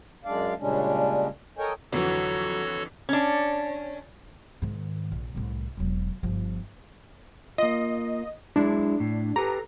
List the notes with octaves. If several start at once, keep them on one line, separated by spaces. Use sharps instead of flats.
F#2 G#3 D4 D5 F5
A#2 C#3 G3 G#3 C#4 D4
A4 A#4 C#5 D#5 G5 G#5
F2 D3 E3 F#3 F#4 A4 C#5
C#4 D4
G#2 D#3
A#1
C2 A2
E1 F#3
G1 F3
A#3 F4 D#5
F#3 G#3 D4 E4
A2
G4 A4 B4 A#5